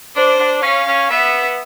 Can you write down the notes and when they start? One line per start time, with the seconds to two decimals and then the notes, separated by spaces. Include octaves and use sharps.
0.16 D4 C5
0.39 D4
0.63 C#4 F5
0.87 C#4
1.11 B3 E5